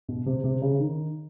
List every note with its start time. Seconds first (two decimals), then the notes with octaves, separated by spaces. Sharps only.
0.08 B2
0.26 C3
0.44 C3
0.62 C#3
0.80 D#3